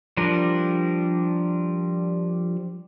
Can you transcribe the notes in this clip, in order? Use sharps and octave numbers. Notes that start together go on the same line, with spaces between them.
F3 G3 D4 A#4